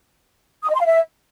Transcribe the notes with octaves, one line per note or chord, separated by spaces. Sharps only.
D#6
D#5
C6
F5
E5